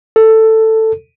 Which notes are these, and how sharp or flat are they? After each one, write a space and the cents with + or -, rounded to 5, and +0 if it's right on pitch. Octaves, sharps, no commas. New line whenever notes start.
A4 +10